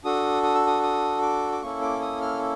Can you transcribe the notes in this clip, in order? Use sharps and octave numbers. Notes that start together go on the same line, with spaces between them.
D4 F#4 A4 D#6
D#6
E6
D#6
D#6
D6
D6
A#3 C#4 E4 A4 C#6
D6
D#6
F6